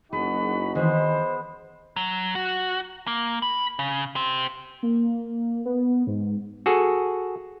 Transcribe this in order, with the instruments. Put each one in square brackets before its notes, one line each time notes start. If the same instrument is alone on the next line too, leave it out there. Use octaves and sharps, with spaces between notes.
[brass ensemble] F#1 D#4 F#4 [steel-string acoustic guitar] G#4 [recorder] B5
[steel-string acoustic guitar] D#3 E3 [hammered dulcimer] G#3 B3 [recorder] C5
[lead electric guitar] F#3
F#4
A#3
B5
C#3
G4 C5
[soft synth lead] A#3
B3
G#2
[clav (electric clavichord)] F#4 G#4 A4